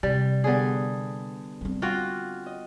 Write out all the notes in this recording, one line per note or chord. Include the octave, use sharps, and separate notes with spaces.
C3 G3
D3 G3 B3 G#4
G3 C4
F4 F#4 F5 G5 D6
D#5